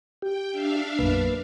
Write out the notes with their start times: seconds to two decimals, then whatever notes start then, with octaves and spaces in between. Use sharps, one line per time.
0.22 G4 G5
0.51 D4 E5 F5
0.99 B1 F#2 A#3 B4